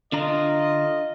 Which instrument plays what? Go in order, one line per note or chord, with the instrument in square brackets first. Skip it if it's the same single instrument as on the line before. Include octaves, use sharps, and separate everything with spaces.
[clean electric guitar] D3 D4 A#5 [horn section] F4 D#5